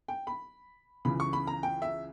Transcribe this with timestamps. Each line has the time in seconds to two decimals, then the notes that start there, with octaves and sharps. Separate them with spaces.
0.08 G5
0.27 B5
1.05 C#2 C#3 E3 B5
1.20 C#6
1.33 B5
1.47 A#5
1.63 G5
1.82 E5